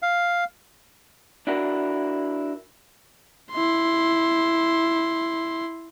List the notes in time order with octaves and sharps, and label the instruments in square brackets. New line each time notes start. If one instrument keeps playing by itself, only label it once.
[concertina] F5
[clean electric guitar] D4 E4 F#4 A#4
[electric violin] E4 C6